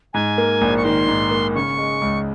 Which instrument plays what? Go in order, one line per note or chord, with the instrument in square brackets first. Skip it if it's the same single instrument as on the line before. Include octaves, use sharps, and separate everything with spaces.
[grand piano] G#2 [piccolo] G#5
[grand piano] A#3
A#1
[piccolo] C#6
[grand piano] D#3 [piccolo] C6
[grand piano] G#2
A#3
[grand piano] C#3 [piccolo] C#6
[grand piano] G#3
C#2